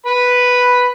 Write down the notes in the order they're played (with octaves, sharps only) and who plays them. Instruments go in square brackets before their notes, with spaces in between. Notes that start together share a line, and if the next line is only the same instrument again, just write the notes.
[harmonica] B4 B5